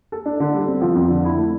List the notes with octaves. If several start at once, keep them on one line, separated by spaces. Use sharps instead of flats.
A4
D4
D3
G3
C4
F3
F2
D3
E4
A3